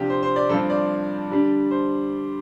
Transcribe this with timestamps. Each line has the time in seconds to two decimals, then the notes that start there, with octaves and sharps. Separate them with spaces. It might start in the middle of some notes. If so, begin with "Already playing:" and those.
Already playing: C3 F3 D4 G4
0.10 C5
0.23 C5
0.36 D5
0.49 G2 F3 C4 A4
0.70 D5
1.30 D3 G3 D4
1.71 C5